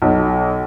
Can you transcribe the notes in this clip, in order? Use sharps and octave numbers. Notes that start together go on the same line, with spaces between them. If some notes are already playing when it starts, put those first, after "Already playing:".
B1